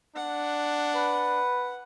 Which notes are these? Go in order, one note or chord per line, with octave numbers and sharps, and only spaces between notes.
D4 F#5
B4